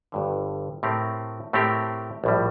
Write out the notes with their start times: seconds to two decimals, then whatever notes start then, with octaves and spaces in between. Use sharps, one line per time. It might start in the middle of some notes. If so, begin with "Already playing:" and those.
0.12 G1 G2 D3
0.83 A2 A3 C4 G4 A#4
1.53 A2 A3 C4 G4 A#4
2.24 A#1 A2 G3